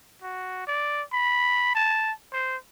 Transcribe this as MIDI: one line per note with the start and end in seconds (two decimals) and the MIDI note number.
0.22 0.67 66
0.67 1.02 74
1.12 1.75 83
1.75 2.12 81
2.33 2.56 72